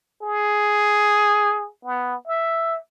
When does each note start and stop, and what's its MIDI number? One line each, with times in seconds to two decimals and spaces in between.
0.23 1.69 68
1.85 2.15 59
2.27 2.77 76